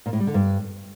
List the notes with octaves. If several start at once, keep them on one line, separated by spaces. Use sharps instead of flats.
A#2
A2
G3
D3
G2